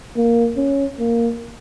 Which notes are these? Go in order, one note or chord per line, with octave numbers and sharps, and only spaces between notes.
A#3
C#4
A#3